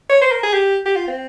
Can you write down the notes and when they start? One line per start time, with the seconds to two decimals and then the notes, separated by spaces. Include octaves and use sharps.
0.10 C#5
0.21 C5
0.31 A#4
0.43 G#4
0.53 G4
0.85 G4
0.96 F4
1.07 C4